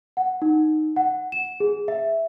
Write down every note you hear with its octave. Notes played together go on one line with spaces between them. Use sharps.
F#5
D#4
F#5
E7
G#4
E5